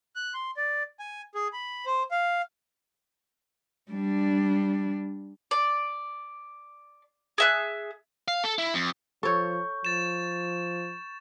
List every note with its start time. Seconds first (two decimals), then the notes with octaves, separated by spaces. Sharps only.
0.16 F#6
0.34 C6
0.57 D5
0.99 G#5
1.35 G#4
1.53 B5
1.86 C5
2.11 F5
3.91 G3 D4
5.51 D5
7.38 G#4 E5 F#6
8.28 F5
8.44 A4
8.58 E4
8.74 F2
9.23 F3 A4 C#5 C#6 G6
9.85 F3 A6 E7